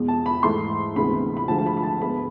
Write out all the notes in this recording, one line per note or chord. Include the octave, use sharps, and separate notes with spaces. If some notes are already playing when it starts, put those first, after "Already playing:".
Already playing: E2 B2 G#3
A5
B5
G#2 E3 A3 C6
D2 C3 E3 G#3 B3 B5
B5
D2 D3 F3 G#3 A5
A5
B5
B5
A5
G#2 G#3 B3 B5